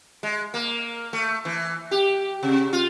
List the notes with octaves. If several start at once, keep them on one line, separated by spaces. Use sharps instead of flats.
G#3
A#3
A3
E3
G4
C3
F4